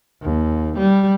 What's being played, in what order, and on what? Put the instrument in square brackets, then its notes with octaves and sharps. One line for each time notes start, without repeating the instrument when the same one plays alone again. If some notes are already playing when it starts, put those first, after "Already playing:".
[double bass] D#2
G3